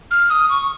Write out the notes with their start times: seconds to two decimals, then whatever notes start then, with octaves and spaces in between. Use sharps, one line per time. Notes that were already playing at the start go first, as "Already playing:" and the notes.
0.11 F6
0.30 D#6
0.49 C#6